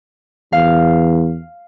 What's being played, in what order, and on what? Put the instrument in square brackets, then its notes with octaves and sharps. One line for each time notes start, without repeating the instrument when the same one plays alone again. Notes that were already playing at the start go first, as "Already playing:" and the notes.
[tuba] E2 [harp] F5